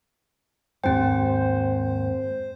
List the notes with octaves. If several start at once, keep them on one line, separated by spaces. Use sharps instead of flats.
D#2 G#2 C4 C5 G5 G#5